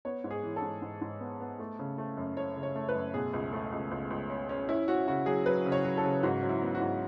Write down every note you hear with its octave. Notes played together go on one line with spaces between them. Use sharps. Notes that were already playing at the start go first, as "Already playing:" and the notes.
B3 C#5
G#2
G#4
E3
A4
G#2
G#2
G#2
B3
B3
A3
C#3
A3
F#2
A3 C#5
C#3
C#5
A3
B4
F#2
B2 G#4
C#2
A3
C#2
C#2
C#2
C#4
C#4
C#4 E4
C#4 F#4
C#3 F#4
F#3 G#4
F#3 B4
C#3
C#5
F#3
A4
C#3
G#2 F#4
F#3
E4
B3
F#4
G#2